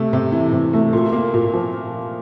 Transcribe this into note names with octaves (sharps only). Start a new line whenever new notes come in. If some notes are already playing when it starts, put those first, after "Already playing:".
Already playing: C3 A3
C3
E3
C3
A3
A#2
A#3
A#2
F3